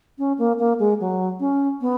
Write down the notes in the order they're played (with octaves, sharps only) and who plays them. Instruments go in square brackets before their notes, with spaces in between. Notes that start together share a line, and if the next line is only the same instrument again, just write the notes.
[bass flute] C#4
A#3
A#3
G#3
F#3
C#4
B3